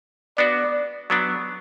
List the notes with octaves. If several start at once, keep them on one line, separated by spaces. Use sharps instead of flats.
B3 D4 F#4 D5
F#3 B3 D4